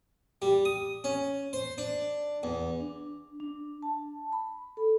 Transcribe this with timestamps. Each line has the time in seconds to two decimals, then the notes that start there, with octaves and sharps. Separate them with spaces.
0.42 G3
0.65 D#6
1.04 C#4
1.53 C5
1.78 D4
2.43 E2
2.80 D4
3.40 D4
3.82 A5
4.33 B5
4.77 A4